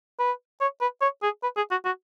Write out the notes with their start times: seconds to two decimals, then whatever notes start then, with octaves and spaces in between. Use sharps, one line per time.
0.19 B4
0.60 C#5
0.81 B4
1.01 C#5
1.23 G#4
1.43 B4
1.57 G#4
1.71 F#4
1.85 F#4